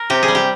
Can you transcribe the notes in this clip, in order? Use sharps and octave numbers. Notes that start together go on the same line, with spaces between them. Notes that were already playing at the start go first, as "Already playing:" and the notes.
Already playing: A#4
C3 G4
G#4
G3
G4